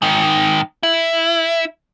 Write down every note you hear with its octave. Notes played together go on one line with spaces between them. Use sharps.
G#2 D#3
E4